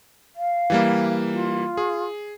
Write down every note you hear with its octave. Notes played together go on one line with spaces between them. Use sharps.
F5
E3 G3 A#3
F4
G#4